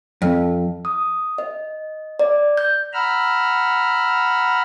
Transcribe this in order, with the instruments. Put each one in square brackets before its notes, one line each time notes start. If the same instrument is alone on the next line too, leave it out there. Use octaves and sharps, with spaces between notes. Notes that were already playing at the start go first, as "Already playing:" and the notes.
[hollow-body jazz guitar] F2
[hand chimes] D#6
D#5
D5
G6
[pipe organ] F#5 A#5 B5 E6 F6